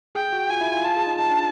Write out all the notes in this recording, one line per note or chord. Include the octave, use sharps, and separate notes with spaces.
G#4 G5
F#4
F4 G#5
E4
F4
F4 A5
G#4
D#4
D#4 A5
D4